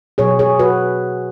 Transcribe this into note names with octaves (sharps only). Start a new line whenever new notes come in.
B2 F#3 C#4 G#4 C#5
G#4 C#5
F#4 B4